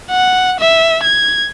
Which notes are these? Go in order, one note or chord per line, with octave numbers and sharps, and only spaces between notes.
F#5
E5
G#6